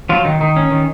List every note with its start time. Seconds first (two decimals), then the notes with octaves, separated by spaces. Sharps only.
0.09 F3 F#3 F4
0.25 D#3 D#4
0.40 D#3 D#4
0.56 C#4
0.71 D#3